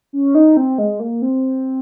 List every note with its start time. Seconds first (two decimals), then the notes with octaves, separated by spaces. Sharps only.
0.13 C#4
0.35 D#4
0.57 C4
0.78 G#3
1.00 A#3
1.22 C4